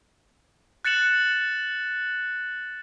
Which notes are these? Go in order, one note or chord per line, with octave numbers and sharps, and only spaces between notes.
F#6 A6 C#7 E7 F#7